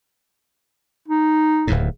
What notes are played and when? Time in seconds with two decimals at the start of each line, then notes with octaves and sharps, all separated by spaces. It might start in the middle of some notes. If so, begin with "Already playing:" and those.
1.08 D#4
1.67 D1 D#2 A2